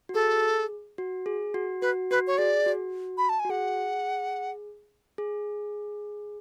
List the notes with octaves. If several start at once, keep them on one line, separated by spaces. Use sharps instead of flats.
F#4
G#4 A4
F#4
G#4
F#4
F#4 B4
F#4 B4
C#5
G#4 D5
F#4
B5
A5
G#5
F#4
G#4 F#5
G#4